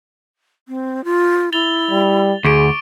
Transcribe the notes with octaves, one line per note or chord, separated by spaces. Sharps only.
C4
F4
E4 A6 F7 G7
G3
D2 G#4 C#6 D6 D7